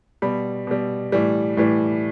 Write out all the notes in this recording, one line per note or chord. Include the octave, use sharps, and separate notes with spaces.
B2 G3 B5
B2 G3
A2 E3 G3
A2 E3 G3